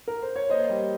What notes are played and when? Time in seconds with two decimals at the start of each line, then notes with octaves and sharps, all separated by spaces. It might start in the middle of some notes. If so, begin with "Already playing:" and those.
0.08 A#4
0.22 C5
0.36 C#5
0.50 A#3 C5 D#5
0.69 G3